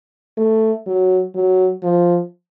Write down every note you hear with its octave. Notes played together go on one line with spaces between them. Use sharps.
A3
F#3
F#3
F3